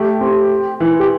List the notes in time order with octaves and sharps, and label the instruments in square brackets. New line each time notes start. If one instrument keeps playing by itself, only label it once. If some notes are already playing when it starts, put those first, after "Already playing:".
Already playing: [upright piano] A3 [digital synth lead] G4
[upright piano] C4
E3
[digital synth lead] G4